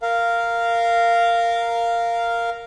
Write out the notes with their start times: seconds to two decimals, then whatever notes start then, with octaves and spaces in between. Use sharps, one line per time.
0.02 A#4 F5